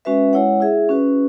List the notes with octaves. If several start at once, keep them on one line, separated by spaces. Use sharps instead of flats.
G#3 C#4 F#4 B4 E5
G#3 E4 C#5 F#5
E4 G#4 E5
C#4 F#4 B4